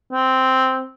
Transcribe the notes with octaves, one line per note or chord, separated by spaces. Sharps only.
C4